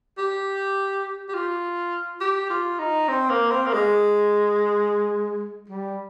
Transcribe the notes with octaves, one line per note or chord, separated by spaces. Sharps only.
G4
G4
F4
G4
F4
D#4
C4
A#3
C4
A#3
G#3
G3